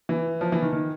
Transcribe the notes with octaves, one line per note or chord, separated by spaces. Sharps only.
E3
F3
E3
D#3
D#3